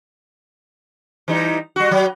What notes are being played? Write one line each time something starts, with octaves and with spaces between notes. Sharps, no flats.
E3 G3 D#4
G3 F#4
F#3